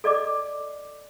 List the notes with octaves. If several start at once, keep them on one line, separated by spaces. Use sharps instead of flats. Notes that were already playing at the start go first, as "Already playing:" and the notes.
A4 D5 D#5 D6